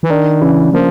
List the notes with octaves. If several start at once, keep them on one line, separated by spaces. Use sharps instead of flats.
E3
D#3 D4
C#3 E3
F3 A#3